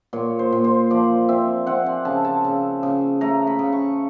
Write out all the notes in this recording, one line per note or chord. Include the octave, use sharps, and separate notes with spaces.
A#2 C#5
C5
A#2
C5
F3 D5
C4 E5
C4 F#5
G#5
C#3 A5
A5
C#3
C#3
A3 A#5
B5
C#3
C#6